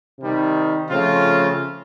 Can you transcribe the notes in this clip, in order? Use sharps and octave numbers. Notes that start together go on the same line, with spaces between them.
C3 D#3 G3
C#3 F3 A3 C4 F4